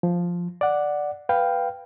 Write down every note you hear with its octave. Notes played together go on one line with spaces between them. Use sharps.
F3
D5 F#5
B4 F5 G5